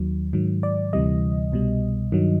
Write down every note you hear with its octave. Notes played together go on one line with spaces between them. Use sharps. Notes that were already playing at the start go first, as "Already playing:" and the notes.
Already playing: D#2 D#3 F#3
G#2 D#3 F#3
D5
D2 C3 E3 G3 D#5
C2 B2 G3
G2 D#3 F#3